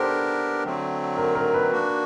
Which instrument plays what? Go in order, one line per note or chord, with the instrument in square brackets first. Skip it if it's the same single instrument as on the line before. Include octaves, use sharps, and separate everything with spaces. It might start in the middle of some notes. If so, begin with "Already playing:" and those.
Already playing: [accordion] B3 D4 G4 A#4 [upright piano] A4 C5
[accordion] D3 F#3 A3 C4
[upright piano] A#4
A#4
B4
[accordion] A#3 D4 F#4